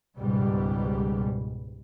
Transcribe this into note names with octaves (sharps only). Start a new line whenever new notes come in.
C#2 G#2 B2 G3